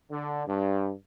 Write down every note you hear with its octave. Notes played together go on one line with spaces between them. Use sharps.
D3
G2